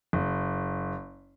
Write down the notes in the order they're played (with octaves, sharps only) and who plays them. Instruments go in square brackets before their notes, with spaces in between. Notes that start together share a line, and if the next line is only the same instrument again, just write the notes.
[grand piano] F#1